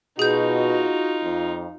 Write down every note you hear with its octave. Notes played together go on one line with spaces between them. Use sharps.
B2 D#4 F4 F#4 G#4 G6
F2